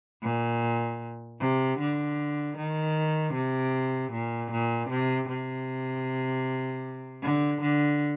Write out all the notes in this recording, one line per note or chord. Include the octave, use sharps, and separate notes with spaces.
A#2
C3
D3
D#3
C3
A#2
A#2
C3
C3
D3
D3